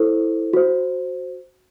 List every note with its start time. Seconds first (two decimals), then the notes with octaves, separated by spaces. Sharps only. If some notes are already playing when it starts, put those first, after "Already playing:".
Already playing: E4 A4 C5
0.53 F#4 C5